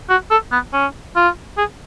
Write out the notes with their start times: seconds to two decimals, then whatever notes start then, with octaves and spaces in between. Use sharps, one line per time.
0.10 F#4
0.31 A4
0.52 B3
0.73 C#4
1.16 F4
1.58 G#4